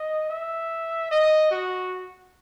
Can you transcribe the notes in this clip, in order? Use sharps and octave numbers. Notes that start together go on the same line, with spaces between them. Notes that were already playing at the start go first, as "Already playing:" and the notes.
Already playing: D#5
E5
D#5
F#4